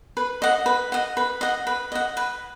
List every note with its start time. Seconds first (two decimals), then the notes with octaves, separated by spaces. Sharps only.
0.17 B4
0.42 D#5 F#5
0.66 B4
0.92 D#5 F#5
1.17 B4
1.41 D#5 F#5
1.67 B4
1.92 D#5 F#5
2.17 B4